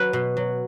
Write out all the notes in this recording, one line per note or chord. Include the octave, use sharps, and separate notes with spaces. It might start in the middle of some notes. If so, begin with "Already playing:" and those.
Already playing: F#3 B4
B2
F#3